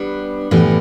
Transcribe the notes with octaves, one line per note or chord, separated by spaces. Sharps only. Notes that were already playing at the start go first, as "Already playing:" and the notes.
Already playing: G3 B3 D4
A2 E3 G3 B3